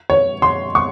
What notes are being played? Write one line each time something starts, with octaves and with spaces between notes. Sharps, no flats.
C#5
C6
C#6